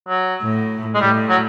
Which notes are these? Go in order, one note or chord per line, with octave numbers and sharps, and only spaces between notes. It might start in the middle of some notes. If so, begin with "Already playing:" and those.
F#3
A2
G#3
A2 G3
F#3